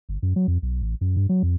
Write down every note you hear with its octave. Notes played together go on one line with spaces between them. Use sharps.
G1
F#2
F#3
F2
B1
A1
F#2
G2
F#3
F2